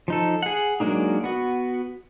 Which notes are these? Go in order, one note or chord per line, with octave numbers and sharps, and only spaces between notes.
F3 D#4 A4
G#4 F#5
F#3 G#3 A#3 D4 D#4
B3 F#4